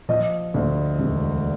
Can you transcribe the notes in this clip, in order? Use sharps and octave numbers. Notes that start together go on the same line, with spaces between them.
F3 D#5
D2
E1